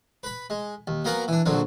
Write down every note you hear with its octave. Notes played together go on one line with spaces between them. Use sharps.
B4 B5
G#3
D#2
F#3 A#3 B3 A#4 F#5 G#5
E3 D4
A#1 D3 F#3 C4